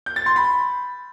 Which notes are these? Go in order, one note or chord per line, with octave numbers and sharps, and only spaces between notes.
G6
A6
C6
B5